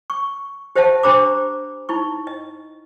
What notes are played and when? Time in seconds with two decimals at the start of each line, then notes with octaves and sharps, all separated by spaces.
0.10 C#6
0.76 G4 C5 D#5 E5 F#5 A5
1.03 D4 G4 C5 A#5 B5 D6
1.89 D#4 E4 C#6
2.27 D#5